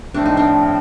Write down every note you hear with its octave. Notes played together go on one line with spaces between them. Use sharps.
A2 F3 A3 C4 D4
D#4
D4